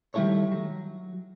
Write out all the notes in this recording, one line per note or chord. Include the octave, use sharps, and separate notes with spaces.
D#3 G3 A3 E4 A4 C#5
F#3